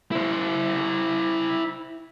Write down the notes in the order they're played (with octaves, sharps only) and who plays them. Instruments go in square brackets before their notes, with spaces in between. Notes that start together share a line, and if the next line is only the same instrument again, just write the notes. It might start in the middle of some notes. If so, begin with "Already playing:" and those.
[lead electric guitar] E4 C5